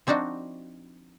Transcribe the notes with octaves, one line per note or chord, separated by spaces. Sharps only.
F3 C4 D4 D#4 F#4